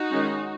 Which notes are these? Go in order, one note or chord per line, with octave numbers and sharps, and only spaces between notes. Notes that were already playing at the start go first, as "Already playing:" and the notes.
Already playing: D#4 F#4
D#3 G#3 C#4